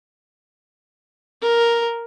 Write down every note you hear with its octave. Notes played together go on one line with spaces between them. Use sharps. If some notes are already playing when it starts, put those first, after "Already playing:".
A#4